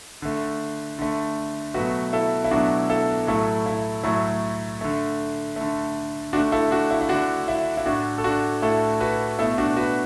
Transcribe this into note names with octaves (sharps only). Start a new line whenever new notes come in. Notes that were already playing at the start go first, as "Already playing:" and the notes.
D3 A3
D3 A3
B2 F#3 A3 F#4 B4
E4 A4
E4
B2 F#3 A3 D4 F#4
E4 A4
A2 F#3 A3 E4 A4
E4
A2 F#3 A3 E4
D3 A3
D3 A3
D3 A3 D4 F#4
E4 A4
D4 F#4
E4
E4
D3 A3 D4 F#4
E4
E4
A2 A3 D4 F#4
A4
D4 F#4
A2 A3 E4 A4
F#4 B4
B2 A3 E4 A4
D4 F#4
F#4 B4